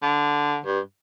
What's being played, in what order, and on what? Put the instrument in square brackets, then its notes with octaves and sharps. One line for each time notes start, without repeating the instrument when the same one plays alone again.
[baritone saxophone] D3
G2